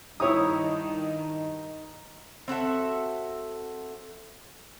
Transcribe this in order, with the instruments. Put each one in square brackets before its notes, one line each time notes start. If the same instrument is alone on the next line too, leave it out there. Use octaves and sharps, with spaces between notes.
[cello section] G2 D#3 [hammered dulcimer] D#4 [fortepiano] E4 C#5 D#6
[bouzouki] C4 F#4 A4 E5